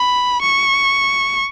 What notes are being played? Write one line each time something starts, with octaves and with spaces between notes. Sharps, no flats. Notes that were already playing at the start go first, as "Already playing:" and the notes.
Already playing: B5
C#6